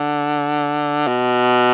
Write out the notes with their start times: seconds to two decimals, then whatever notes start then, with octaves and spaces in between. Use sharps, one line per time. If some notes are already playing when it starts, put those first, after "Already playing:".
Already playing: D3
1.08 B2